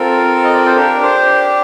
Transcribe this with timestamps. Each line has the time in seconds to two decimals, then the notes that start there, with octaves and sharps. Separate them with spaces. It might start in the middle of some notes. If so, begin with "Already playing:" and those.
Already playing: C4 F4 A4 A#4
0.44 D#5
0.54 D5
0.66 C5
0.76 D4 G4 A#4
1.03 C5